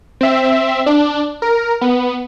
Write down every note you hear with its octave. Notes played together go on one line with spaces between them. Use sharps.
C4 E5
D4
A#4
B3